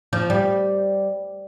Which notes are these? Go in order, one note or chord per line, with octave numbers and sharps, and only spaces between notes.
F3
G3